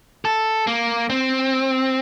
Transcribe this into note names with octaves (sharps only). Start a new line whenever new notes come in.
A4
A#3
C4